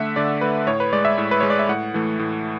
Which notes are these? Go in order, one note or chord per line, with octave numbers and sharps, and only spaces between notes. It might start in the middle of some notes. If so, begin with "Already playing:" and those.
Already playing: D3 A3 E5 F#5
D3 D5
A3 B4
A2 C#5
B4
G#3 D5
E5
A2
B4
G#3 C#5
D5
E5
A2 F#5
E3 A3
A2